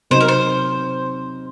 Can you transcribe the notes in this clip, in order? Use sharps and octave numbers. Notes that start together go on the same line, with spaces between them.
C3 F#3 C4 D#4 C5
A#4
C5